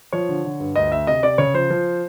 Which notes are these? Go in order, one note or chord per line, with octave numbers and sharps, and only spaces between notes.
F3 C#5
D3
D3
G2
D2 D#5
D2 E5
C3 D#5
C3 D5
C#3 C#5
F3 C5
F3